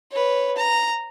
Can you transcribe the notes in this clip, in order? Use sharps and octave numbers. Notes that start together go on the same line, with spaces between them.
B4 C#5
A#5